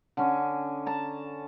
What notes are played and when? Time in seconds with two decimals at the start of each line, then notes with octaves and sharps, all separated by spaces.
0.17 D3 C#4
0.86 A5 A#5